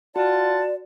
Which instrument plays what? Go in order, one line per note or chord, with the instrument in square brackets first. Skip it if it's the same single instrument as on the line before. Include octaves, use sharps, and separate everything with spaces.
[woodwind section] F4 F#5 A5 [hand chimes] F#4 [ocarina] D5